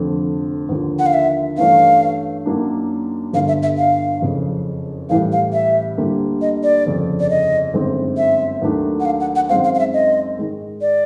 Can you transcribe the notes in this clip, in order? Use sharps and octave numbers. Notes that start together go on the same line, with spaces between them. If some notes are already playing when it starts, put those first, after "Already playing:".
Already playing: F1 F2 D3
D#2 D3 F3
F#5
F5
E5
G2 E3 A3 C#4 F5
F#2 D#3 F#3 A#3 D4
G1 G2 D3 F5
E5
E5
F5
F#1 F2 C#3
A1 A2 E3 G3 F5
F5
E5
D2 D3 G3 A#3
D#5
D5
G1 F2 C#3
D5
D#5
G1 F#2 D#3 G#3 C4
E5
D#2 D#3 F#3 A3 D4
F#5
F5
F#5
F#5
F#2 D#3 G#3 C4 F5
F5
F5
E5
D#5
G#2 D#3 G#3
D5